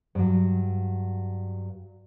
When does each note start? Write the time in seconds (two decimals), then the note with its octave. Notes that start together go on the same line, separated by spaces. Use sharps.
0.15 G2 F#3